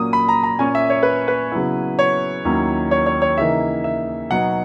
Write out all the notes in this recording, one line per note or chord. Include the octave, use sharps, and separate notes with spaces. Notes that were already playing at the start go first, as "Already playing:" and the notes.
Already playing: A#2 F#3 A#3 C#4 D#6
B5
A#5
A#5
A#2 A#3 C#4 G#5
E5
C#5
B4
B4
C#3 F#3 B3 E4
C#5
D#2 D#3 F#3 C#4 E4
C#5
C#5
C#5
C#3 E3 A#3 D#4 E5
E5
B2 F#3 B3 D#4 F#5